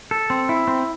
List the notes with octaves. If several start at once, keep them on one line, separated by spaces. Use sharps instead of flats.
A4
C4
E4
C4